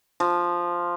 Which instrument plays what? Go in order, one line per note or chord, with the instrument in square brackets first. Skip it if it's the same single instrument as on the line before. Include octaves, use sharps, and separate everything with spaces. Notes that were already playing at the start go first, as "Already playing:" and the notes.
[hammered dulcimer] F3